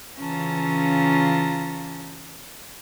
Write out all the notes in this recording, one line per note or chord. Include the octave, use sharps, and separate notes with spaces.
C#3 E3 C#4 F4 A5 A#5